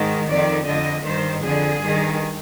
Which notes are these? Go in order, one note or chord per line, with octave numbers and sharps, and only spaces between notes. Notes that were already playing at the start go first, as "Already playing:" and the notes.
Already playing: G#2 D#3
F2 D#3 D5
F2 D3 D#5
G2 D#3 C5
F2 D3 G#4
G2 D#3